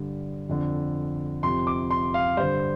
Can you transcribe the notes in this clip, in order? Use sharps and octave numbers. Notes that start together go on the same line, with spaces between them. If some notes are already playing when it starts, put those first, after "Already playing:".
Already playing: G2 D3
F2 D3
F2 C3 C6
D6
C6
F5
G2 D3 C5